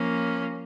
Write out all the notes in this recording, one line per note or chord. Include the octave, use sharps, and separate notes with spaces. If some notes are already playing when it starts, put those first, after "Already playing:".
Already playing: F3 A#3 C#4